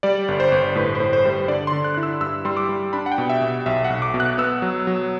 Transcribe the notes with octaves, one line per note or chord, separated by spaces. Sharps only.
G3 D5
G1
C5
G1
A2 B4
C5
A2
C5
G3 C5
D3 D5
D3 C6
F#6
E4 F#6
E6
G2 E6
G3 C6
D6
G3
D4 B5
F#5
G5
B2
E5
B2
B1 E5
F#5
B1
D6
B2
F#6
B3 E6
F#3
F#3